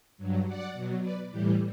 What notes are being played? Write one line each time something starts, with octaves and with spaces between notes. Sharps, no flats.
G2 F#3
D5 F#5
B2 F#3
B4 D5
A2 E3 G3 G4